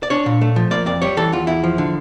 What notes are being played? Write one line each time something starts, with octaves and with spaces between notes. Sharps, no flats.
D5
D4 C#5
A#2
A3
F3
A#3 D5
F2 D5
G3 C#5
E3 A4
E2 F4
E2 E4
F3
D3